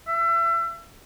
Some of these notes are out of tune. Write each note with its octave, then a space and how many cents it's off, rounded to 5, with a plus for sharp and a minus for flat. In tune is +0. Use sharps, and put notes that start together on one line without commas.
E5 +35